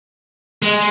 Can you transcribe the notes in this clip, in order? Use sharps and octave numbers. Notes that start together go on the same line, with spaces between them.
G#3